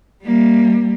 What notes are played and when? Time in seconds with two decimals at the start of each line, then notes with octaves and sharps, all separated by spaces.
0.24 G3 A#3